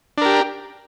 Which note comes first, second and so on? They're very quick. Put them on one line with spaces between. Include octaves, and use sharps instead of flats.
D4 A#4 G4